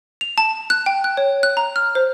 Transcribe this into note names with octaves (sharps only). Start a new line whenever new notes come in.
F7
A5
F#6
G5
F#6
C#5
F#6
A#5
F6
C5